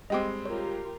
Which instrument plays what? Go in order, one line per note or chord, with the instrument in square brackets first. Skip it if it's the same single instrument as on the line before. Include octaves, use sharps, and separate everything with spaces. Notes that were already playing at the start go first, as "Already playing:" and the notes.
[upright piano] G3 G#3 C4 [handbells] D#5 G5 D6
[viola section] F4 G4 A#4 [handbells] C#5